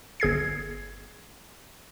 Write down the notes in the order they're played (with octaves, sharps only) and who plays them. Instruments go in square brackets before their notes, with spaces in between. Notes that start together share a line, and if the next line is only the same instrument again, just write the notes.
[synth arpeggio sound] G1 G#4 G#6 C7